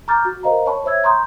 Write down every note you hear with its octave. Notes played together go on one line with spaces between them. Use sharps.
A#5 C#6 D6 F6 G6 A6
F#4
A#4 C5 D#5 F5 A#5
C#5 A5 B5 C#6
C5 C#5 E5 E6 G#6
A#5 C6 C#6 D#6 G6